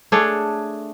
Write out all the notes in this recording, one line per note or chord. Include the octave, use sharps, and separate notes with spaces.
A3 D4 G#4 C#5